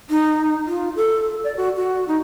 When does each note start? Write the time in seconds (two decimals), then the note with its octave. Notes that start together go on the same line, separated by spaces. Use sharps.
0.10 D#4
0.66 F4
0.96 A4
1.44 D5
1.57 F#4
1.76 F#4
2.08 D#4